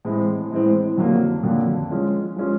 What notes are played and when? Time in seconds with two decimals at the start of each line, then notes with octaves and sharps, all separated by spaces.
0.05 A2 E3 G#3 C4
0.51 A2 E3 G#3 C4
0.97 F2 D3 F#3 A#3
1.43 F2 D3 F#3 A#3
1.91 F3 G#3 C#4 F4
2.36 F3 G#3 C#4 F4